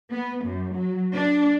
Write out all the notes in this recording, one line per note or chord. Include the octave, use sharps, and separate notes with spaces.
B3
F#2
F#3
D4